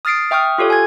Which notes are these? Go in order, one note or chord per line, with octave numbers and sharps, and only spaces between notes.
D#6 F6 A6 C7 D7
E5 G5 C#6 D#6 F6
F4 G4 A4 C#5
G#5 G#6